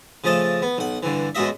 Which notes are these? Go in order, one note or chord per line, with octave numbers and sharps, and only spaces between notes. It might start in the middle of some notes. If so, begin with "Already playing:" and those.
C#3 F3 A3 D#5 A5
B3
B1 F#5
G2 D3 E3
F#2 B2 G#3 F#4 D#5 E5